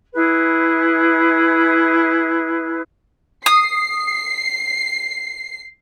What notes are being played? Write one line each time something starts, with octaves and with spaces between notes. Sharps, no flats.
E4 G#4 B4
D#6 C7